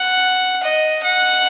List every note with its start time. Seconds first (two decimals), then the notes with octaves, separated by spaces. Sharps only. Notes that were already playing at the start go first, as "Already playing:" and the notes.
Already playing: F#5
0.63 D#5
1.04 F#5